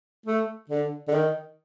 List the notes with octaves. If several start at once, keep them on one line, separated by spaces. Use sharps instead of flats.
A3
D3
D3
D#3